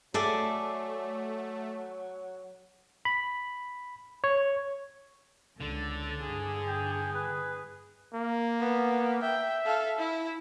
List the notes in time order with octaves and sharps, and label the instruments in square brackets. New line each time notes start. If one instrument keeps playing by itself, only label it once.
[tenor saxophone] F#3 [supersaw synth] A3 [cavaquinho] G#4 D5 E5 [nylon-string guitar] A4
[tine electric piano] B5
C#5
[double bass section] C#2 [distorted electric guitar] D3 D4 [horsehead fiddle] A4
[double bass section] G2 [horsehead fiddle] G#4
[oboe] G5
B4
[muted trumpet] A#3
[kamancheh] B3
[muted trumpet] E5 [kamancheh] G5
[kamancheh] A4 F5
E4